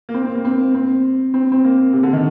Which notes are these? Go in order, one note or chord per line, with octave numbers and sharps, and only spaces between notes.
A#3
C4
C4
A#3
C4
C4
C4
C4
A#3
C3
D3
D#3